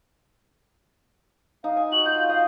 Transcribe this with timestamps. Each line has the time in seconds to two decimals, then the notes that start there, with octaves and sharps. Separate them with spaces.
1.64 D#4 F5
1.77 G#5
1.92 F#4 F#7
2.06 F4 G6
2.29 D#5 F5